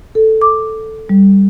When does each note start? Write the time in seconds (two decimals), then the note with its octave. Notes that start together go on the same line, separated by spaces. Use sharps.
0.15 A4
0.42 D6
1.09 G3